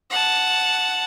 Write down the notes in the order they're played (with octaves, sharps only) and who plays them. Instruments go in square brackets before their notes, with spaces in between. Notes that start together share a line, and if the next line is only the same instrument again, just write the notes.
[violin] F#5 A5